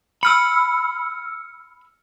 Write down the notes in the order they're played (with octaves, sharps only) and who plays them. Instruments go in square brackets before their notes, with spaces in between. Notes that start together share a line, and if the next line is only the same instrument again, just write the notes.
[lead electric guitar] B5 [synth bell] E6 F6 C#7